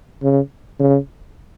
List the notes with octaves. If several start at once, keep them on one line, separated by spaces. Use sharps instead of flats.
C#3
C#3